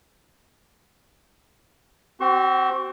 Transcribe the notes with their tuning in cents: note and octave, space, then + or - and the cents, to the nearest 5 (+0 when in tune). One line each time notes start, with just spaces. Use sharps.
C4 +0 F#4 +40 C#6 -45